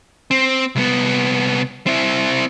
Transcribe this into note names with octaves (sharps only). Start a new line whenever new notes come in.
C4
C2 B3
C4 E4